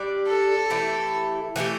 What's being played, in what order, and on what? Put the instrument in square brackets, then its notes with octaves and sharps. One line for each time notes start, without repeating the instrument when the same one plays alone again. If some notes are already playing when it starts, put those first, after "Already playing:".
Already playing: [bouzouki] G3 D4 G4 D5
[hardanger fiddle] A4
[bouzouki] E3 A3 E4 G4
E3 A3 E4 G4